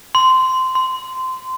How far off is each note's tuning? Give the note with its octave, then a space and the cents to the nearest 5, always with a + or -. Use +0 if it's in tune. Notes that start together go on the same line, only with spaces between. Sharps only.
C6 -15
C6 -20